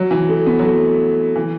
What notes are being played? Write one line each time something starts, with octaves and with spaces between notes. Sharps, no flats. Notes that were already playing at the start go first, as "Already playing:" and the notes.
Already playing: F#3
E3
A3
B3
F#3
A3
E3